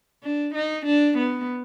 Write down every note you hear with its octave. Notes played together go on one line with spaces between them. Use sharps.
D4
D#4
D4
B3